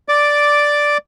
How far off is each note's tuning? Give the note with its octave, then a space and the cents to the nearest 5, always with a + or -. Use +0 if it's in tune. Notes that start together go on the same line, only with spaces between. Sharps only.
D5 +0 D6 +0